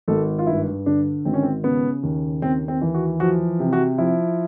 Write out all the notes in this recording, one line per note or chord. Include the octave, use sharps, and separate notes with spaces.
G#1 A4
F4
G2 E4
D3 D4
G#1 C4
C#4
C4
C#3 B3
D#2
D#2 C4
C4
E3
F#4
F3 F#4
C3
F#4
F3 E4